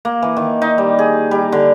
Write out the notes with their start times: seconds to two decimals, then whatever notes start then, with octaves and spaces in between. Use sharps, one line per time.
0.05 A#3
0.22 E3
0.37 D#3
0.62 D#4
0.78 G3
0.99 G#4
1.31 G3
1.52 D3